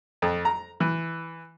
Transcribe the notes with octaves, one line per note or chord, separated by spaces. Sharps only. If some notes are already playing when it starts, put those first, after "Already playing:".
F2
A#5
E3